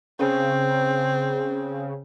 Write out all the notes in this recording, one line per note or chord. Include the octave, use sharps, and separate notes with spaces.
C#3 C4